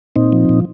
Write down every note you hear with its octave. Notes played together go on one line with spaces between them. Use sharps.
A#2 C4 D#4
F3
A#2